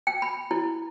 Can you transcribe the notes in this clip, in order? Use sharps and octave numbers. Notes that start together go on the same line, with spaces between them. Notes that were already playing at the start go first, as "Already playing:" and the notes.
G5
B5
E4